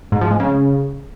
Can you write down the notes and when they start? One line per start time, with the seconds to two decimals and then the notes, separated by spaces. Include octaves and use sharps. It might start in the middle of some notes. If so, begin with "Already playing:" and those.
0.12 G#2
0.21 F3
0.31 G#3
0.40 C#3